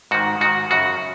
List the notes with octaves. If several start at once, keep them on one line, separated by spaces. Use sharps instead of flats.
G#2 D#3 F#4
G#2 D#3 F#4
F#2 C#3 F#4